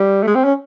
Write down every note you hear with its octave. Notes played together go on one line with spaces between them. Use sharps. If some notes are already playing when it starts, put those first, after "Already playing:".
Already playing: G3
A3
G#3
C4
C#4